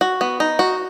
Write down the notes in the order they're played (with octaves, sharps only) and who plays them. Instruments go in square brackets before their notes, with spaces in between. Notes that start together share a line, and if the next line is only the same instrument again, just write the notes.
[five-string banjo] F#4
B3
D#4
F#4